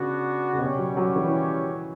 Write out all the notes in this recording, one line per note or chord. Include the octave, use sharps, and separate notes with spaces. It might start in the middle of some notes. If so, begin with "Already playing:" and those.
Already playing: C#3 B3 D4 F#4
C#3
B2 G3 C#4 G4 C#5
F#3
F#3
E3